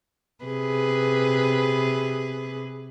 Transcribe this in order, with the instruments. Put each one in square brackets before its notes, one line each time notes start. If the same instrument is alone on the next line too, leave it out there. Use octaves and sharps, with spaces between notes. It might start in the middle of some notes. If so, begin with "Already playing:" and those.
[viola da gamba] C3 G#4 B4